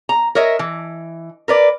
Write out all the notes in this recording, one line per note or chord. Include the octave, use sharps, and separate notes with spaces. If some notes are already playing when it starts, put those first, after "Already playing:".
A#5
A#4 C#5 D#5 E5
E3
A#4 B4 D5